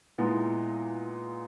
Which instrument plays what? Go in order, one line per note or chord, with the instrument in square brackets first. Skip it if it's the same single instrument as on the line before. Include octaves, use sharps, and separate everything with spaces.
[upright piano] A#2 G#3 B3 D#4 [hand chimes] E4